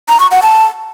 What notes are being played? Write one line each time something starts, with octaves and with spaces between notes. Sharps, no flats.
A#5
C#6
F#5
A5